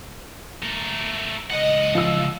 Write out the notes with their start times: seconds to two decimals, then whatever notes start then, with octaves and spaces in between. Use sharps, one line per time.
0.62 A3 A#4
1.50 C#2 D#5 F#5
1.95 F3 E6